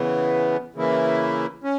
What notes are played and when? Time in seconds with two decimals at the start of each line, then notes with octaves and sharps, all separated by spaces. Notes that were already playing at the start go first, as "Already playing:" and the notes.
Already playing: C#3 E3 B3
0.75 C#3 E3 A#3 E4
1.64 C#4